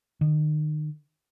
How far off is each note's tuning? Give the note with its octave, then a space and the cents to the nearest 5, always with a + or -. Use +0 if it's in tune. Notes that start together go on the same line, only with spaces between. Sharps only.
D#3 -35